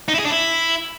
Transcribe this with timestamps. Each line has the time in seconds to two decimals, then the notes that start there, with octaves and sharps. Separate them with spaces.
0.08 D#4
0.14 E4
0.19 G#4
0.25 D4
0.30 E4